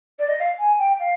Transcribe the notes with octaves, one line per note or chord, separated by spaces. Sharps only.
D5
D#5
F5
G#5
G5
F5